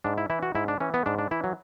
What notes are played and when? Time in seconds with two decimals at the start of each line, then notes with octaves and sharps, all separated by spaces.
0.04 G#2 D4
0.18 E4
0.30 E3 E4
0.43 F#4
0.55 G#2 E4
0.68 D4
0.80 E3 C#4
0.94 B3
1.06 G#2 D4
1.18 D4
1.31 E3 E4
1.44 F#3